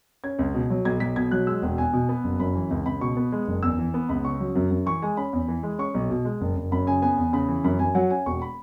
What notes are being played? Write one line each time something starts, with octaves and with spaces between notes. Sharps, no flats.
C#4 G#6
C#2
B2
F#3
B1 G#6
B1 B6
B2 G#6
F#3 F#6
G#3 E6
E1
E2 G#5
B2
B3
F#1
F#2 B5
E3
C#2
C#2 B5
B2 C#6
B3
G#3
F#1
E2 E6
E3
B3
C#2 B5
C#3 C#6
F#3
F#2
F#2
E3 C#6
G#3 G#5
C#4 B5
E2
E3
G#3
C#4 C#6
B1
B2
G#3
F#1
F#1
F#2 B5
C#3 G#5
B3 G#5
E2
C#3 B5
E3
F#2 B5
F#2 G#5
F#3 F#5
C#4 G#5
E1 C#6
B5